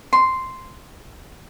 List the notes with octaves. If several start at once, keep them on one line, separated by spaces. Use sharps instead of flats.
C6